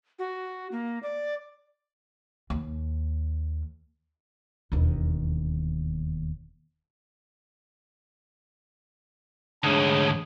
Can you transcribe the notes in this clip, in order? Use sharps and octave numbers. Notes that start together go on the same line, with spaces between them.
F#4
A#3
D5
D#2
E1 D#2
D2 G#2 D4 G#4 C#5